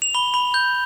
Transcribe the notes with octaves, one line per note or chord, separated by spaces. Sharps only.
F7
B5 G7
B5
G6